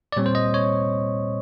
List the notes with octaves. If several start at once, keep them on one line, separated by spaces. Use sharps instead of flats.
D5
A#2 G3 C4 C#5
C5
D#5
C#5